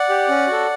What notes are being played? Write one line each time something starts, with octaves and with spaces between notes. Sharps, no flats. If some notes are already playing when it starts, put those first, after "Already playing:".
Already playing: D5 F#5
G4
C#4
F#4 A4